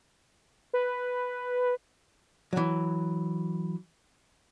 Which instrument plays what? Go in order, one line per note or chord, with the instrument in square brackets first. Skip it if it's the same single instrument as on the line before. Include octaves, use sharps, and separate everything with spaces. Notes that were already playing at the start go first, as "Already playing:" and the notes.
[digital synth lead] B4
[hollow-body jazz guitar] E3 F#3